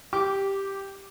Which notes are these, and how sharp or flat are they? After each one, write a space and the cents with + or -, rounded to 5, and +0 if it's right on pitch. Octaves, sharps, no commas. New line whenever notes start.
G4 +0 D6 -15